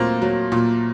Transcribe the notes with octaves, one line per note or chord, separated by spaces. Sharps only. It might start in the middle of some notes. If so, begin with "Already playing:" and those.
Already playing: A#2 F#3 A3 A#3 C4
F#3
A#2